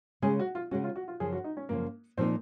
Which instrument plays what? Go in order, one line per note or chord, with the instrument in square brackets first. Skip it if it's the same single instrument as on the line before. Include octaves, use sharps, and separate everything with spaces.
[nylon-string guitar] C#3 G#3 C#4 [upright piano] G#4
[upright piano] F#4
F4
[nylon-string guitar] C#3 G#3 C#4 [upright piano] F#4
[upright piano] F4
F#4
F4
[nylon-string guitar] F#2 C#3 F3 [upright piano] G#4
[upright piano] F#4
D#4
C#4
[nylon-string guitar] F#2 C#3 F3 [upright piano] A#3
[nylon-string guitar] A#2 F3 A#3 D#4 [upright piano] C4